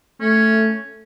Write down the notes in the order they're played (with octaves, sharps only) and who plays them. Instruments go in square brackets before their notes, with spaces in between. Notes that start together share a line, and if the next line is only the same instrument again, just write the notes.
[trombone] A3 [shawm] C#4